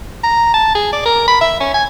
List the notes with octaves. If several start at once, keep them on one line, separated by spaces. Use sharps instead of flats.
A#5
A5
G#4
D5
A#4
B5
E5
C#4
G#5